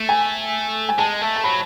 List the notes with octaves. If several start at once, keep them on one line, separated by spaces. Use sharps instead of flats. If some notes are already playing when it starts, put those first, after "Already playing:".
Already playing: A3
G#5
G#5
G#3 A5
A3
A5
F#3 B5